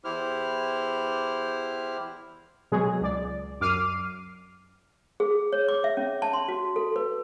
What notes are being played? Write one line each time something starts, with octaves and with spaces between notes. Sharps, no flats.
E2 E4 G4 C5 F6
B2 F#3 G#3 G#4
C#2 D5
F#2 D6 F6 C7 D#7
G#4
C#5
D6
E5
C#4
A5
C6
F#4
A4
B4